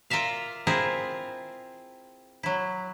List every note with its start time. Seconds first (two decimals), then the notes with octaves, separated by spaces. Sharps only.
0.10 F4 A#4 D5 E5 F5
0.67 C4 E4 F4 G#4 A#4
2.43 F#3 E4